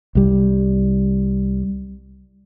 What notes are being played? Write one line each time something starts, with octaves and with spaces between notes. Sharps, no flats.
C2 G3